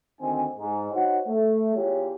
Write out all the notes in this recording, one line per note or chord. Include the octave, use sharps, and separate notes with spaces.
D2 D#3 C4 D#4 G#5
G#2
D#4 F#4 C5 C#5 F#5
A3
E2 F4 G4 G#4 C#5